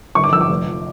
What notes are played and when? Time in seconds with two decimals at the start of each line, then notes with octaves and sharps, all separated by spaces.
0.15 G1 C#6
0.24 D6
0.32 F3 E6
0.41 D6
0.49 F1
0.66 F3